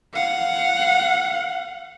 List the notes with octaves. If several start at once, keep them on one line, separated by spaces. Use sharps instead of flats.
F5 F#5